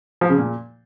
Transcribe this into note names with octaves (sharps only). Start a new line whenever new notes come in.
F3
C#3
A#2